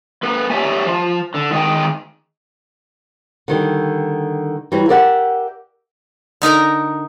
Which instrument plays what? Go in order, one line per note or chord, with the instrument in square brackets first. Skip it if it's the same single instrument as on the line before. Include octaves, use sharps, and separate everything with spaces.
[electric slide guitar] A#3 B4
G4 C#5 D5 E5 G#5
F3
D3
D#3 G#3 D#5 G5
[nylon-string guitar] D3 D#3 G3
E3 F#3 G3
G4 A#4 D5 E5 F#5
[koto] D3 D#4 A#4 A#5